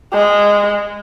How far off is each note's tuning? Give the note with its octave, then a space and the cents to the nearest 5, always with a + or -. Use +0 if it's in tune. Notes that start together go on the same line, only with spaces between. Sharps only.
G#3 -15